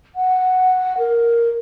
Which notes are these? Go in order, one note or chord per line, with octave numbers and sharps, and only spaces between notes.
F#5
A#4